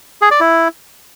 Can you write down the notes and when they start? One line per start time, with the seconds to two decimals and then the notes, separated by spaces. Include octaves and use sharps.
0.22 G#4
0.31 D5
0.40 E4